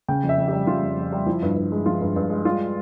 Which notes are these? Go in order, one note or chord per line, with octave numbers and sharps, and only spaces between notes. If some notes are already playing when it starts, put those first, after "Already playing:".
C#3 G5
F2
E5
F2
G3 G4
C#3 F4
F2
F2
G3
F3 E4
G2
G2
G#3
F3 F4
G2
G2
G#3
G3 F4